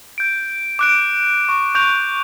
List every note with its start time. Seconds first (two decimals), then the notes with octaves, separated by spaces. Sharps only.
0.18 G6 D7
0.79 D6 F#6 D7
1.49 C#6
1.75 C#6 G6 F7